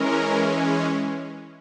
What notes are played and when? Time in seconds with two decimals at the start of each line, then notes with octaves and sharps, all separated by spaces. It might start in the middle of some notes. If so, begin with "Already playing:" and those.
Already playing: E3 G#3 C#4 A#4